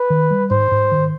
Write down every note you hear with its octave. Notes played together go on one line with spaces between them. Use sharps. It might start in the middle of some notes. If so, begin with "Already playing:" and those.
Already playing: B4
D#3
G3
G#2 C5
G#2
D#3